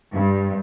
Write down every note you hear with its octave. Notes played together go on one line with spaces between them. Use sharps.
G2